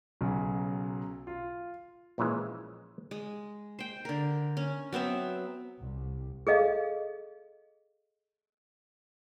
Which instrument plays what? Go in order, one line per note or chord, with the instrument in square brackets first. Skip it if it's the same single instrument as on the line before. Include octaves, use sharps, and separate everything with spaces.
[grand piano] B1 C#3 F#3
F4
[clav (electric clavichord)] A#1 A#2 C#3 E3 G#3
[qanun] G#3
C5 G5
D3 A#4
C#4
F#3 B3 C4 E5
[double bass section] C2
[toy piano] G#4 A4 D#5 F5